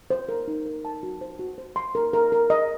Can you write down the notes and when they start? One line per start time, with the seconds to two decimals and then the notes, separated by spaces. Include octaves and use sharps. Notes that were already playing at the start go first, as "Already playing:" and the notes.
0.10 C5
0.29 A#4
0.48 D#4
0.66 A#4
0.85 A5
1.03 F#4
1.21 C5
1.39 F#4
1.58 C5
1.76 C6
1.95 A#4
2.14 A#4
2.32 A#4
2.50 D#5